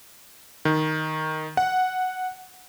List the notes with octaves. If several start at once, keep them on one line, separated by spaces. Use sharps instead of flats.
D#3
F#5